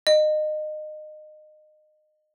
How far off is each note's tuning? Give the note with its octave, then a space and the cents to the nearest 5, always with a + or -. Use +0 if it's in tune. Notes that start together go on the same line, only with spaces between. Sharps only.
D#5 -25